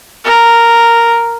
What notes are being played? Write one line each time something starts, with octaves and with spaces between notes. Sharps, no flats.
A#4